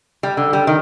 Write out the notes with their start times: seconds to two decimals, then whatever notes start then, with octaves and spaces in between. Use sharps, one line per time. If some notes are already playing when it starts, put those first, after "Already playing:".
0.23 G3
0.37 D3
0.53 G3
0.67 D#3